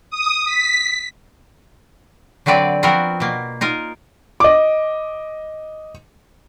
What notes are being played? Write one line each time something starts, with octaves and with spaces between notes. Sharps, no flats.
D#6
B6
D3 F#3 C4 B4 D5
F3 B3 C4 F4 F#4 A#4
B2 A#3
D#4 F4 A#4
D#5 D6